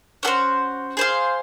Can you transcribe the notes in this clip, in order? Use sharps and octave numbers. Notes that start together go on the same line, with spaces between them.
C#4 F#4 A4 C5
G#4 C5 F5